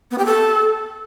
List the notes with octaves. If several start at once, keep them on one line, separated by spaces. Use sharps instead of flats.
B3
G4
A4